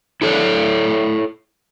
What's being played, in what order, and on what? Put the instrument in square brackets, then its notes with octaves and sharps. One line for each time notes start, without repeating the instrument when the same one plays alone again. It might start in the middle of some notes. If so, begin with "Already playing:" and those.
[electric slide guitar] E4 A4 C#5 D5